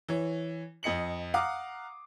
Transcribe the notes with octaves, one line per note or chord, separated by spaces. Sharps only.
E3 C#5
F2 D#5 C#7 F#7
F5 F#5 A#5 D6 D#6